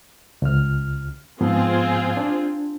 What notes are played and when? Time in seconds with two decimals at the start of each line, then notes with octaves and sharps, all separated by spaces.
0.42 C#2 F6
1.41 G#2 F3 B3 C4 F4 G#4
2.17 D4